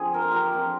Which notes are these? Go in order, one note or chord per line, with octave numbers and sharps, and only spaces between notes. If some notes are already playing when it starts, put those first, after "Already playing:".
Already playing: D3 F3 C4 G#4
A#4
C5
G4 A#4
D3 F3 C4